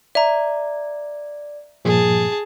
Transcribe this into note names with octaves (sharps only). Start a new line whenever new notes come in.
D5 E5 A#5
G2 A#2 F3 G#4 A5